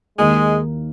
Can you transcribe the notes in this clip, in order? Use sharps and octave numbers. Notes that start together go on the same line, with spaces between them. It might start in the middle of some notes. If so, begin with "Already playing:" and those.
D#2 D#3 G#3 A#3